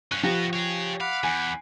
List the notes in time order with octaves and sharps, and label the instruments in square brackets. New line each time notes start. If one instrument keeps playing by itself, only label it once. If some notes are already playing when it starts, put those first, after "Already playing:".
[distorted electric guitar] G2 C#4 [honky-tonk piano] F#6
[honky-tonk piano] F3 G4 A#6 [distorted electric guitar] B3 F#4
[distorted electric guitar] G#4 C#5
[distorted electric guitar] F5 [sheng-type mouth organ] F#5 B5 D6
[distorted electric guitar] E2 [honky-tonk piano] G#5